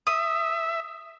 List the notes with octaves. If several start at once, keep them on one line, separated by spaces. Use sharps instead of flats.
E5 D#6